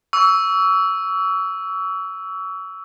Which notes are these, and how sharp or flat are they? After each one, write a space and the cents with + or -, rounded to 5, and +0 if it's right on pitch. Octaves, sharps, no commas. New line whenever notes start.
C#6 +35 E6 +0